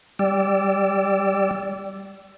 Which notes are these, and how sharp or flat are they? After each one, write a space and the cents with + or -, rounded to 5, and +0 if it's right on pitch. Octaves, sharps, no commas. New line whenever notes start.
G3 +0 D5 -10 E6 +20